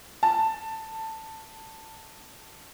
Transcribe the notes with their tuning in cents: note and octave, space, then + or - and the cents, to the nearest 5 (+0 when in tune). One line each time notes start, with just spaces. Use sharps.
A5 +15